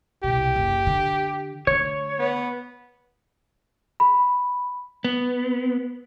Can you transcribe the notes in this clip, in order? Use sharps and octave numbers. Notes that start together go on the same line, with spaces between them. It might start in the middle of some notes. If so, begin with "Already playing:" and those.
C2 B2 G4
F#1
D3
D3 A3 C#5
B3
B5
B3